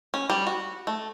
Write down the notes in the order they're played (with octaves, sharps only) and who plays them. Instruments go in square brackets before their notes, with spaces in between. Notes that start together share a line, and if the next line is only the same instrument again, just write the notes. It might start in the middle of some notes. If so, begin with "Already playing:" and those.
[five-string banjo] C#4
G3
F#4
A3